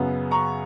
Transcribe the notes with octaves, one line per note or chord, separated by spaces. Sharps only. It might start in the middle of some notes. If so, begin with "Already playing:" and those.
Already playing: F#2 C#3 F#3 B3
A#5 C#6